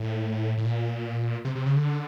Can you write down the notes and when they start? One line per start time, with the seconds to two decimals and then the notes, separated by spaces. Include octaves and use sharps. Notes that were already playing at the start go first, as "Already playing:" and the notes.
Already playing: A2
0.57 A2
0.65 A#2
1.45 C3
1.55 C3
1.66 C#3
1.76 D3